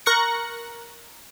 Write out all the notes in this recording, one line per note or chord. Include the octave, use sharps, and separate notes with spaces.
A#4 C#6 F#6 A#6 C#7